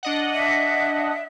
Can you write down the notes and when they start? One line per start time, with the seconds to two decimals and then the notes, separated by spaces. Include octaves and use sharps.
0.03 D4 D#5 F#5
0.32 E5